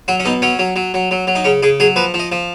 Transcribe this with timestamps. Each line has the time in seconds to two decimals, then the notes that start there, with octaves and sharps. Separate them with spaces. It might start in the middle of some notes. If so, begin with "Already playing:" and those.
0.08 F#3 F#4
0.20 C#4
0.25 B2 D#4
0.42 F#3 C#4
0.59 F#3
0.76 F#3
0.94 F#3
1.11 F#3
1.27 F#3
1.35 D#4
1.45 C#3 C#4
1.63 C#3 G#4
1.80 F#3 G#4
1.96 F3 B4
2.14 F3
2.19 D#5
2.32 F3